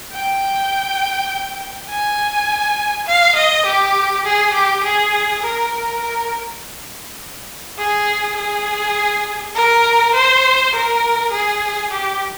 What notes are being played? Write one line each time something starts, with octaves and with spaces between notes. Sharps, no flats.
G5
G#5
F5
D#5
G4
G#4
G4
G#4
A#4
A#4
A#4
G#4
G#4
A#4
C5
A#4
G#4
G4